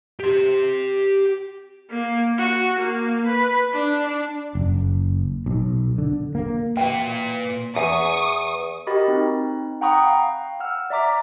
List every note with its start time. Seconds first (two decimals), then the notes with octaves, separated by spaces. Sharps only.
0.20 G4 C6
1.90 A#3
2.38 F#4
2.79 A#3
3.26 B4
3.73 D4
4.55 F#1
5.46 B1
5.98 D3
6.35 A#3
6.77 A#2 E3 F#4 F5 G5
7.76 E2 C#6 D#6
8.87 F#4 G4 A#4 D#5 B5 A6
9.08 C4 D#4
9.81 F#5 G5 A#5 B5 C#6 D#6
10.06 F5
10.60 F#5 E6 F6
10.90 D5 E5 A#5 D6 B6